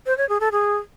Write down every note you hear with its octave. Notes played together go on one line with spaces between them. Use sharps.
C5
C#5
G#4
A4
G#4